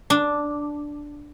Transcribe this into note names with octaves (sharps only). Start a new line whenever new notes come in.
D4